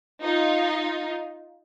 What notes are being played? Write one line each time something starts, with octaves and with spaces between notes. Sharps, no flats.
D#4 F4